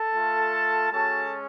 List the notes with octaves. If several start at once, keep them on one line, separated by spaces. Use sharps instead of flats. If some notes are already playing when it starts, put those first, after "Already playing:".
Already playing: A4 A5
A3 F4
G#3 C#4 F#4 A4 A5